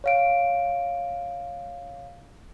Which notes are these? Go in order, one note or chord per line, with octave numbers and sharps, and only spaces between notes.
C#5 F5 D7